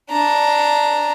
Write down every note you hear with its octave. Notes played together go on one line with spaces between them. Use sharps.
D4 A#5